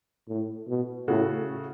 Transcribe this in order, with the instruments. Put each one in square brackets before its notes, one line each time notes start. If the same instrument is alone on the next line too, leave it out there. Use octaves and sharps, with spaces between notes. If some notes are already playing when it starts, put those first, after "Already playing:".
[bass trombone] A2
B2
[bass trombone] A2 [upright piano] C#3 A3 F#4